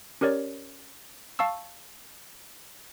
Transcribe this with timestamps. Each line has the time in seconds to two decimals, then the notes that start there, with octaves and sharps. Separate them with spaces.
0.21 C#4 G4 A#4 C#5 D5
1.39 F5 A5 C#6 E6